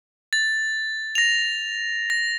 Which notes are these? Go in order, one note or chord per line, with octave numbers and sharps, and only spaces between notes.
A6
A#6 F7
A#6